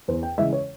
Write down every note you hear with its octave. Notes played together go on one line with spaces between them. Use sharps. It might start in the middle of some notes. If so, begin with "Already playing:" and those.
E2 C5
G5
C#3 E3 G#3 E5
C#5